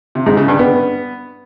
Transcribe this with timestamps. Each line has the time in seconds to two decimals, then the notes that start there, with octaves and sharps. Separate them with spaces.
0.15 C3
0.26 G#2
0.37 C#3
0.48 G2
0.59 B3